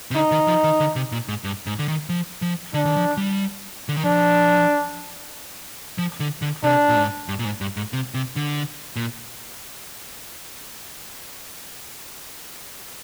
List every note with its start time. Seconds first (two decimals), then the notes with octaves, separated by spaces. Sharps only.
0.11 C3
0.15 D3 D#4
0.31 D#3
0.48 F3
0.64 D#3
0.80 D3
0.96 C3
1.12 A#2
1.28 G#2
1.44 G2
1.67 G#2
1.79 D3
1.88 D#3
2.09 F3
2.42 F3
2.74 D3 D4
2.85 D#3
2.97 F3
3.17 G3
3.89 D3
3.97 D#3
4.04 F3 D4
5.98 F3
6.20 D3
6.42 D3
6.63 C3 D4
6.89 A#2
6.96 G#2
7.29 G2
7.39 A#2
7.45 G#2
7.61 G2
7.77 G#2
7.93 C3
8.14 C3
8.36 D3
8.96 A#2